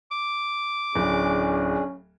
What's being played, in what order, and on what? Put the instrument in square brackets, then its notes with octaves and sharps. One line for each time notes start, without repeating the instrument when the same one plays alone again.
[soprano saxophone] D6
[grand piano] D1 [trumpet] C#4 [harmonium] D4 G#4